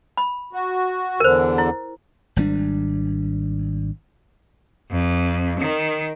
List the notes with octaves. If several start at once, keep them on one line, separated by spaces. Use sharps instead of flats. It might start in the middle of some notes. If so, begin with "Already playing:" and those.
B5
F#4
E2 D3 A#4 C5
E4
G#1 G3 C4 D4
F2
D#3